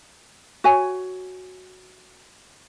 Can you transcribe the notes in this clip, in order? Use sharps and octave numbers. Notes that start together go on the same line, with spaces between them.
F#4 C#5 G#5